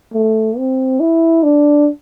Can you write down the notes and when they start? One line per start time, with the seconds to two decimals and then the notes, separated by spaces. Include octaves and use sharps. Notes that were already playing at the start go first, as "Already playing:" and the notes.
0.14 A3
0.58 C4
1.00 E4
1.43 D4